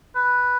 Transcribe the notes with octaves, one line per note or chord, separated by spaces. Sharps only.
B4